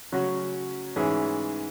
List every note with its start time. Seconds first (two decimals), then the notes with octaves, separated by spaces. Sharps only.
0.12 C#3 F#3 C#4 F#4
0.96 G#2 E3 C#4 E4 G#4